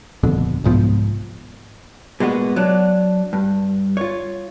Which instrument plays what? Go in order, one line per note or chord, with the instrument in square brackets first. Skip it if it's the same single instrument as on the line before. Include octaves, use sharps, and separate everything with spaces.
[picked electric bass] D#1 F2 B2 D3
C2 G#2 F3 B3
[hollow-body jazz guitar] A#2 G#3 B3 F#4
F#3 D4
G2
F4 C#5